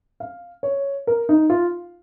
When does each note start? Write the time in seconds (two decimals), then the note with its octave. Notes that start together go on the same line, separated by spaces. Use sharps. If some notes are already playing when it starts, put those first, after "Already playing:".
0.20 F5
0.63 C#5
1.07 A#4
1.29 D#4
1.50 F4